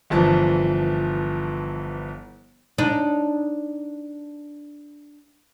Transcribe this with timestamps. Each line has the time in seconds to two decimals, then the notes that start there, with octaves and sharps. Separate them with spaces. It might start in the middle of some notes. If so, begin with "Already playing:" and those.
0.10 G1 E3 F3 A5
2.78 D4 D#4